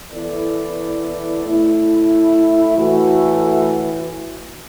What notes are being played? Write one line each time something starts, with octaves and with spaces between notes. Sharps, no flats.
E3 B3 E4 A4 D5
A2 A3 E4
A2 E3 A3 F#4